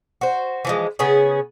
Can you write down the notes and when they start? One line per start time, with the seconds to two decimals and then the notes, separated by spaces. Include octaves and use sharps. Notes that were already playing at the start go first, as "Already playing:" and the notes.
0.21 F#4 C5
0.65 E3 F3 G#3
0.99 C#3 B3 C#4 G#4